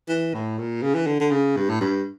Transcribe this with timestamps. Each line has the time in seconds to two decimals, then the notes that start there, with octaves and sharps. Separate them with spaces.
0.09 E3
0.34 A2
0.58 A#2
0.82 C#3
0.95 E3
1.07 D3
1.20 D3
1.31 C#3
1.56 G2
1.69 A2
1.81 G2